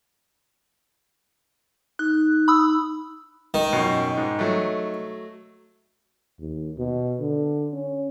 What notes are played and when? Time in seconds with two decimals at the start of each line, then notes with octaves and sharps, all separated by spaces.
1.99 D#4 F#6
2.48 B5 D#6 E6
3.54 D#3
3.73 F#2 B2
4.17 G#2
4.39 F#3 A3
6.39 D#2
6.78 B2
7.20 D3
7.74 C#4